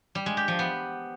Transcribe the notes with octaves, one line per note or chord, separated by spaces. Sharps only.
G3
G#3
G4
F3
B3